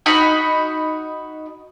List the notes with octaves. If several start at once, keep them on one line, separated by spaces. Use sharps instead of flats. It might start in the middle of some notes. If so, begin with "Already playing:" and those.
D#4 F#4 B5